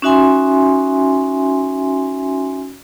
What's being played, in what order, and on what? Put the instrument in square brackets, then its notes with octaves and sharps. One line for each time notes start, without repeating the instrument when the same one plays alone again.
[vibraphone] C#4 D#4 F#4 E5 G#5 C6